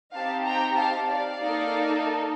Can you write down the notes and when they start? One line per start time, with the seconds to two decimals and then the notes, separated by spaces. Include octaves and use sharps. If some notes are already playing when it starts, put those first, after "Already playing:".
0.13 C4 D#4 G4 F5 A5
0.45 G5 A#5
0.77 F5 A5
1.09 D5 F5
1.40 A#3 D#4 A4